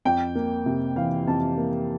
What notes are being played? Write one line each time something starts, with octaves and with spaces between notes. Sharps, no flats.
F2 G5
A#3
C3
E3 F5
F2 A5
A#3